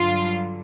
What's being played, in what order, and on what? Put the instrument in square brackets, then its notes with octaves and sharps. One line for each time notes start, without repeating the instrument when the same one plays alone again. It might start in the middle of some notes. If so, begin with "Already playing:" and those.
Already playing: [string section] G2 D3 F#3 F4